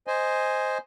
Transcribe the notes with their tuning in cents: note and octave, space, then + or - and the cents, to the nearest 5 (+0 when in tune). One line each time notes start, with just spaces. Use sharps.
C5 +0 D#5 +0 G#5 +0